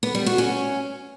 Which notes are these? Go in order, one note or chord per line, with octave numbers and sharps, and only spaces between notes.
B3
G3
F#4
C#4